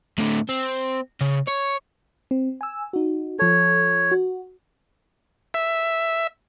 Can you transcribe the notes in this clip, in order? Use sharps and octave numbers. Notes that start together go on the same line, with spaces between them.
A2 D3
C4
C#3
C#5
C4
G#5 E6
D#4 F#4
F3 A4 C#5
F#4
E5